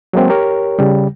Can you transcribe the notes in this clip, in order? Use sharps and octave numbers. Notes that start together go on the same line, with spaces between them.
F#3 G#3 A#3 C4
G4 A#4 C#5
C#3 G3